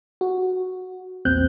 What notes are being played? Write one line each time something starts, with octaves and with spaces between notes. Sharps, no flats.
F#4
A#1 E2 A#2 C4 F#6 G6